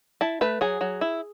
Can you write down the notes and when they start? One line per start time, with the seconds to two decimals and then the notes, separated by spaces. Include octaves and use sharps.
0.21 E4 A5
0.41 A3 B4
0.61 F#3 G#4
0.81 F#3
1.01 E4